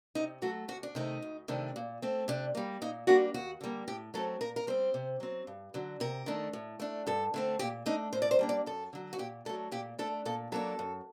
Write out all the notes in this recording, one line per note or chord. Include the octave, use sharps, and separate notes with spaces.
C3 D#4
F#3 A3 F#4
D2 F#4
D4
C3 D#3 A3 D#4
D2
C3 D#3 A3 D4
A#2
A3 C4
C3 D4
G3 A#3
A#2 D#4
G3 A#3 D4 F#4
D#2 F#4
D3 G3 A#3
A2 G4
F#3 A3 C4 A4
A#2 A#4
A#4
G3 C4 C5
C3
F#3 C4
G2
D3 F#3
C3 A#4
D#3 A3 D4
A2
A3 D4
G2 A4
D3 A3 C4
A#2 G4
A3 D4 D#4
A2 C5
D5
C5
G3 A#3 D4
D5
F#2 A4
D3 F#3
F#4
A#2 G4
F#3 A3 D4 A4
A#2 G4
A3 D4 A4
A#2 A4
F#3 A#3 D4 A4
F#2